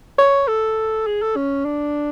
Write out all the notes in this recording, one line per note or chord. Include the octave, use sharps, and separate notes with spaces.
C#5
A4
G#4
A4
C#4
D4